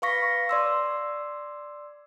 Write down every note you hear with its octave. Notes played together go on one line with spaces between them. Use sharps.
B4 F5 C#6 A#6 B6
D5 C6 E6